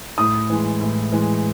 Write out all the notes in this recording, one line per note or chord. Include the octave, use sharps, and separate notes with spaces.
A2 D#6
E3 G#3
A2
E3 G#3